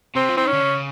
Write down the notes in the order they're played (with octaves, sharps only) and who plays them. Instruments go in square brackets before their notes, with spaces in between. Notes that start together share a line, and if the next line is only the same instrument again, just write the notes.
[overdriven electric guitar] C3 [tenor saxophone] C4
[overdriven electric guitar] F3
[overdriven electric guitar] E3 [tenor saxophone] C4
[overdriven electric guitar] D#3 [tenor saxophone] C#4
[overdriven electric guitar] D3
C#3